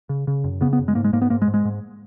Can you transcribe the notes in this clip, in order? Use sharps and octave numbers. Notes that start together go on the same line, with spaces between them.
C#3
C#3
F#2
C#3 B3
B3
F#2
G#3
G#2 A#3
G#3
G#2 A#3
B3
G#2 A#3
G#3
G#2
G#3
G#2